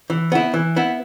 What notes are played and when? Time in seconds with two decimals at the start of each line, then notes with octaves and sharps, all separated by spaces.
0.10 E3
0.32 B3 E4
0.54 E3
0.76 B3 E4